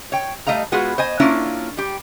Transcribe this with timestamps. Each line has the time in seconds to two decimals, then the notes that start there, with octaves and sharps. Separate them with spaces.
0.12 C#5 G5
0.47 G3 A3 D#5 F5 A#5
0.72 G#3 B3 F4 F#4 G#4
0.98 C5 D#5 G#5
1.20 A#3 C#4 D4 E4 F4
1.77 G3 G4